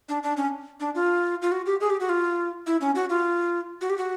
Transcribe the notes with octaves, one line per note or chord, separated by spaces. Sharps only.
D4
D4
C#4
D4
F4
F4
F#4
G4
G#4
G4
F#4
F4
E4
C#4
F#4
F4
F#4
G4
F#4